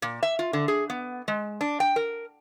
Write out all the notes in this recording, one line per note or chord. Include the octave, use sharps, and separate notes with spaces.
A#2
E5
F4
D3
G#4
B3
G#3
D4
G5
A#4